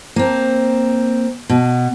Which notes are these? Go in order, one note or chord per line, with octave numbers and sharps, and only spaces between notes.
A#3 C4
B2